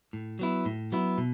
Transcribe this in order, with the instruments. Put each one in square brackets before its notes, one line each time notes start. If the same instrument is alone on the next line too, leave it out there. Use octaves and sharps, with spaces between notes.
[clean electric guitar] A2
F#3 B3 E4
A2
F#3 B3 E4
B2